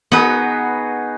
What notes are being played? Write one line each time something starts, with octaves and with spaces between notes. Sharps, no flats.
B3 D#4 F#4 G#4 B4